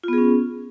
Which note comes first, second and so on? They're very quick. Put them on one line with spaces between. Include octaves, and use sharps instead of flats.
F4 B3 G#4 C#4